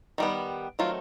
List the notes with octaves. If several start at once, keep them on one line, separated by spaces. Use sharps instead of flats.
D#3 G3 B3
D#3 F#3 A3 C4 F4